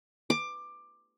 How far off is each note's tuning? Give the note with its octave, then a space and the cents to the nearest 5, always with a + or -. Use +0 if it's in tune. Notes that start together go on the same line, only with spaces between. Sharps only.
D6 +15